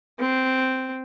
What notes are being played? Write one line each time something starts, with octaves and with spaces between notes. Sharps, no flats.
C4